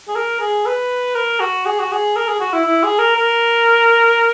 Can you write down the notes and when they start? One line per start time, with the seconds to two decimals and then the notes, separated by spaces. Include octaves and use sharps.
0.08 G#4
0.16 A#4
0.40 G#4
0.66 B4
1.15 A#4
1.40 F#4
1.66 G#4
1.79 F#4
1.92 G#4
2.16 A#4
2.28 G#4
2.41 F#4
2.53 E4
2.65 E4
2.83 G#4
2.99 A#4
3.17 A#4